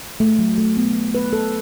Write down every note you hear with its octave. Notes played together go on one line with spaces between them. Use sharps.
A3
F#3
A3
B3
B4
A4